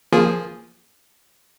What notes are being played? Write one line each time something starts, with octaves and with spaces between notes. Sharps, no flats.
F3 A#3 G#4